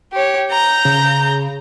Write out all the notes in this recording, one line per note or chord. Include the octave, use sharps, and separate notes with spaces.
G4 C#5
A#5 G6
C#3